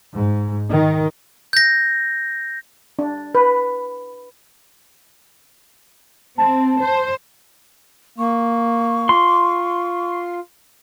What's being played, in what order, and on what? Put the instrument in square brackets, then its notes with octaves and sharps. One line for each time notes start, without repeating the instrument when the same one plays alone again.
[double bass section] G#2
D#3
[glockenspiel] G6 A#6
[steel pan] D4
B4
[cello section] C4 [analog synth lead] A5
[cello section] C5
[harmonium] A#3 [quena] C#6
[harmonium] F4 [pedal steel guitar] C6